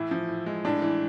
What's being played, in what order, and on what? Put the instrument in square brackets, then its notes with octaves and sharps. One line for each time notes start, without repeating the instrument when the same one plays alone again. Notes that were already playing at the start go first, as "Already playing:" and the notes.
Already playing: [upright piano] A2 E3 [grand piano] E4
[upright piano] F3
A2
G#3
[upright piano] A2 [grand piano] D4
[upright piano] E3